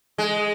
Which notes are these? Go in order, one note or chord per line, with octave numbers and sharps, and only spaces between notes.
G#3